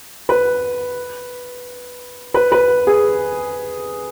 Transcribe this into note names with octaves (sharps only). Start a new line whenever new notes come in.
B4
B4
B4
G#4